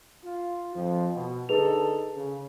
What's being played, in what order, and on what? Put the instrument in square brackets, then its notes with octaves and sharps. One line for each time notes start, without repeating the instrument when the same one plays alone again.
[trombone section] F4
F2 F3
B2
[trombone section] D3 D#4 A4 [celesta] G#4 B4 F7
[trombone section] C#3